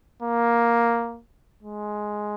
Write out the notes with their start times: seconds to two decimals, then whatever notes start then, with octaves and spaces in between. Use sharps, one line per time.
0.23 A#3
1.63 G#3